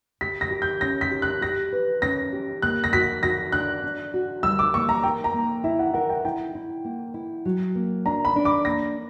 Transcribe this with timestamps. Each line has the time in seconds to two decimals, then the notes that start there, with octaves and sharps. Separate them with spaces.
0.21 G4 B6
0.41 A#6
0.51 G4
0.62 G6
0.81 C#4 A#6
1.01 B6
1.11 G4
1.22 F#6
1.41 G4 A#6
1.72 B4
2.02 C#4 A#6
2.33 G4
2.62 A#3 F#6
2.84 A#6
2.93 F#4 B6
3.23 F#4 A#6
3.52 D4 F#6
3.84 D4
4.14 F#4
4.43 G3 E6
4.59 D6
4.73 A#3 C#6
4.89 A#5
5.03 A#4 G5
5.24 A#5
5.34 A#3
5.64 E4 E5
5.79 F#5
5.94 A#4 F#5
6.09 G5
6.25 E4 G5
6.55 E4
6.84 A#3
7.14 E4
7.45 F#3
7.75 A#3
8.06 D4 A#5
8.25 B5
8.36 D4
8.45 D6
8.65 A#3 A#6